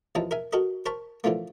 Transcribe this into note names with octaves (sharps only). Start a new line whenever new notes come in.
D#2 E3 F3 D#4 A5
A#4 E5 G#5
F#4 A4 A#4 D#5
A#4 C5 A5 B5 C#6
D3 E3 F3 A3 A#3